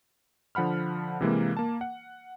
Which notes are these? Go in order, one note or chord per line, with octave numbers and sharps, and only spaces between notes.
D3 F3 F#5 B5 F6
C3 E3 G#3 A#3
A#3 A5
F#5